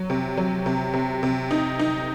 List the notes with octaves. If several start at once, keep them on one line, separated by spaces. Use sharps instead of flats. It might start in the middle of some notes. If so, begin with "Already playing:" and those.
Already playing: F#3
C3
F#3
C3
C3
C3
D#4
D#4